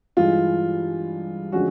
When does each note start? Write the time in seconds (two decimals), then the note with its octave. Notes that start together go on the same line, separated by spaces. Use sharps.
0.17 G2 E3 G#3 F4
1.52 D3 F3 G#3 C#4 F#4